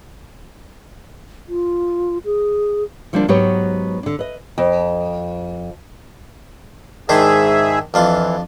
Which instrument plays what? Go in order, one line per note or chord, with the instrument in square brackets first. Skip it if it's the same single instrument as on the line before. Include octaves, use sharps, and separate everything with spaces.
[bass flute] F4
G#4
[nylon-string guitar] D3 F3 G3 A#3 C4 D4
G#2 F#3 B3 G4 B4 C#5
D3 D4
B4 D#5
[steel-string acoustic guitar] F2
[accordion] G#2 G#4 E5 [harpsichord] D#3 D4 C5
[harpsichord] F2 D4 F4 [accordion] E3